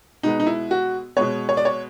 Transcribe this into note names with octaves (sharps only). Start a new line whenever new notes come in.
B2 G#3 B3 D#4
D#4
E4
F#4
B2 G#3 B3 C#5
C#5
D5
C#5